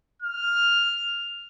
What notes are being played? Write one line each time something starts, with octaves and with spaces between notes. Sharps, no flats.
F6